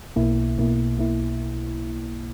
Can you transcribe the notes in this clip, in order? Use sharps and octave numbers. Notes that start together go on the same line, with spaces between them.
B1 B2 A#3 E4
B1 B2 A#3 E4
B1 B2 A#3 E4